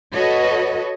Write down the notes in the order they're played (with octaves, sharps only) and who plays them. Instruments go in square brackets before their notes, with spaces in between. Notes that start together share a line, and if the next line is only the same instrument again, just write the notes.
[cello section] F#4 A4 B4 C#5 D#5